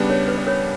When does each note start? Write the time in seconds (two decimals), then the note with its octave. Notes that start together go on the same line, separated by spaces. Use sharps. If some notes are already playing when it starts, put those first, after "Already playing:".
Already playing: C#3 G3 B3 D4
0.10 A#4 C#5
0.28 B4
0.38 D5
0.47 A#4 C#5